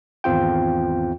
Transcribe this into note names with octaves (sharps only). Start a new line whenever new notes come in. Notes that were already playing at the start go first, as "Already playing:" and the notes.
G#1 E2 C4 F4 G5